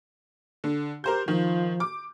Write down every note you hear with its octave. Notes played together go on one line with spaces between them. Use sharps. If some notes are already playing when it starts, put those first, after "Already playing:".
D3
G4 A#4 C5 G6
D#3 F3
D6